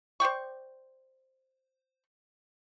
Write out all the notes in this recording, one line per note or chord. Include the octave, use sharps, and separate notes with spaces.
C5 D5 G5 C#6